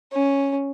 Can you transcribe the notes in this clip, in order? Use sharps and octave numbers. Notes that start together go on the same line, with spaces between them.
C#4